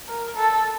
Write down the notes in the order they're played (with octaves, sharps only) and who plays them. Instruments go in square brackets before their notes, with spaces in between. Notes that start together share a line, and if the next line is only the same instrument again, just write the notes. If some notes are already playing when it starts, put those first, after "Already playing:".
[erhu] A#4
A4